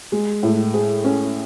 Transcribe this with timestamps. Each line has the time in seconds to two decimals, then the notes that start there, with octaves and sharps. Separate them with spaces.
0.12 G#3
0.43 A2
0.74 G#4
1.04 C#4